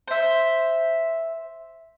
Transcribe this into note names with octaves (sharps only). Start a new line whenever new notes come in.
C5 E5